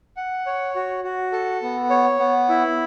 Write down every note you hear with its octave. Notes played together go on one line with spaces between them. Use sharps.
F#5
C#5
F#4
F#4
A4
B3
C#5
B3
E4